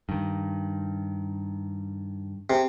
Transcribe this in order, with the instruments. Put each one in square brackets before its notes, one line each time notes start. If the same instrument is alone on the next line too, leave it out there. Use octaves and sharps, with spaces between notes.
[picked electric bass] G2 D#3
[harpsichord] C3